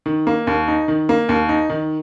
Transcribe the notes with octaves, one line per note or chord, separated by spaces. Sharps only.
D#3
A#3
D#2
D#4
D#3
A#3
D#2
D#4
D#3